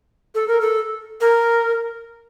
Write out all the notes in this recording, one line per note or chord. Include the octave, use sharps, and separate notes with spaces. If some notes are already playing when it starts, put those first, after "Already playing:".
A4
A#4
A4
A#4